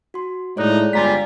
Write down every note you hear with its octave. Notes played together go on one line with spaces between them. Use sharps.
F#4 C6
A2 G#3 D#4 C#5 D5 F#6
G1 G3 F4 D5 F5 G#5 A#5 B6